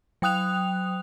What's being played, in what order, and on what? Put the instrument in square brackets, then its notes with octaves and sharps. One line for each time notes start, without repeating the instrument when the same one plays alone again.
[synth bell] F#3 G5 D#6 F#6 F7